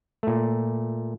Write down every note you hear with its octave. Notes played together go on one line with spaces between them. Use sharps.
A#2 A3